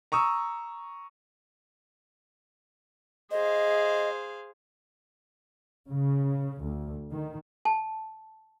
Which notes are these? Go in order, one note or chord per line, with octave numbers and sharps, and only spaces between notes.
A#5 C#6 D#6 E6
G#4 C5 D#5 F5
C#3
D2
D#3
A5